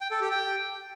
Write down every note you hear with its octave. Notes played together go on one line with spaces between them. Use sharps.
G5
A4
G4
G5